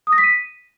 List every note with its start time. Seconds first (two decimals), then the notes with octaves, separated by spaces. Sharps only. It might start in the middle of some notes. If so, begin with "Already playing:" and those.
0.07 D#6
0.13 A#6
0.18 B6
0.24 D#7